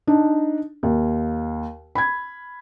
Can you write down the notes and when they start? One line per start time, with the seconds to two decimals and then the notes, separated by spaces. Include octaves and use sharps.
0.07 D4 D#4
0.83 D#2
1.95 B5 G#6